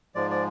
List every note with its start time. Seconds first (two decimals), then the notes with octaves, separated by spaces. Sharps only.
0.15 G#2 F3 G#3 D5
0.30 D5